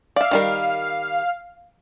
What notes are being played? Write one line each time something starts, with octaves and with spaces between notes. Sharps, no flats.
D5 E5 F5
D#3 G3 A#4